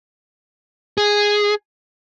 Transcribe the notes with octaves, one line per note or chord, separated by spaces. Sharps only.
G#4